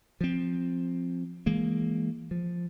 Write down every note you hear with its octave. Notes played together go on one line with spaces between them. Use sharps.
F3 C4
E3 G#3 A#3
F3